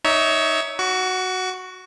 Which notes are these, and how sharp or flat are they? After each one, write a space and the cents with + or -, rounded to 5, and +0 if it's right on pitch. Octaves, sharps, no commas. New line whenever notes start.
D#4 +0 C#5 +20 E5 -15
F#4 +0 C#6 +40